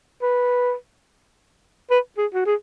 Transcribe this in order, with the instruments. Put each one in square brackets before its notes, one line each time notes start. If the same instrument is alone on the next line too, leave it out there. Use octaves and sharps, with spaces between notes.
[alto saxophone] B4
B4
G#4
F#4
G#4